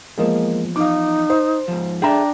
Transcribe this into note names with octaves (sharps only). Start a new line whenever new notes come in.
E2 F3 G#3 A#3 D#5
D#4 F5 D6
C5
G#2 F3
D4 G#4 A4 E5 G5 A#5